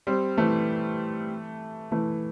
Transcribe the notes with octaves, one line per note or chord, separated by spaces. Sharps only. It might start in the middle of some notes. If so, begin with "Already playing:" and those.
G3 C4
E3 A3
E3 A3